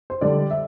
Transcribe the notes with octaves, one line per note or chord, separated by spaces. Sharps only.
C5
D3 G3 D5
E5